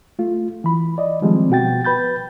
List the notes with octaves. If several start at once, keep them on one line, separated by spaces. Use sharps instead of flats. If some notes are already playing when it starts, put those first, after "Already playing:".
A3 F4
E3 B5
D5 D#5
D#3 F3 G3 G#3 C4
B2 B3 F#4 G5 A6
B4 B5 G6 A6